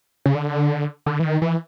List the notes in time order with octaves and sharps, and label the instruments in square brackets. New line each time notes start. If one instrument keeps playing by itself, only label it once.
[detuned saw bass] C#3
D3
D3
E3
D#3
E3